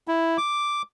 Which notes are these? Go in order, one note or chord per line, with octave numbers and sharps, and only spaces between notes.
E4
D6